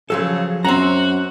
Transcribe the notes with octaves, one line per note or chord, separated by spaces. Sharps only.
C#3 F3 F#3 A4
F#2 C4 F#4 A#5